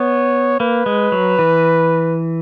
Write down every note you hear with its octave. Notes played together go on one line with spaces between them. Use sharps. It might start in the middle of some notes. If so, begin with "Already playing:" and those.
Already playing: B3 C#5
A#3 B4
G#3
F#3
E3